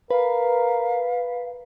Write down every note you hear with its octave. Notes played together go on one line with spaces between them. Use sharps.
A#4 B4 F5